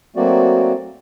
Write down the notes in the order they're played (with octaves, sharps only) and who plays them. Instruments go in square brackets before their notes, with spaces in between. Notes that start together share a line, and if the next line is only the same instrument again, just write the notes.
[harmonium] F#3 A3 A#3 C4 F#4 D5